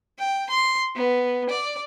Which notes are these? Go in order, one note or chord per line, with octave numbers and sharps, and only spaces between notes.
G5
C6
B3
D5